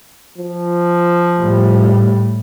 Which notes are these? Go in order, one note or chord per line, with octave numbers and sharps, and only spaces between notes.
F3
A2 G3